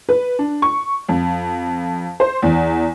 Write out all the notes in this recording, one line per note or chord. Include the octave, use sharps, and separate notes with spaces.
B4
D4
C#6
F2
C5
E2